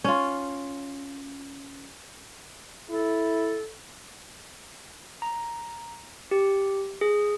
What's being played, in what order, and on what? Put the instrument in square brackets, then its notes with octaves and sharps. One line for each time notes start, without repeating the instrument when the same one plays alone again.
[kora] C#4 F4
[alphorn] E4 [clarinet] A4
[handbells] A#5
G4
G#4